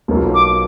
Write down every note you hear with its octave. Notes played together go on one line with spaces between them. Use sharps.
B1 B2 A#3 F4
D6